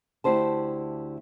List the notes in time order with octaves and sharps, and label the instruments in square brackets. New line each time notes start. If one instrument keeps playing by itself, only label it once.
[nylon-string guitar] D2 E4 G4 C5 A5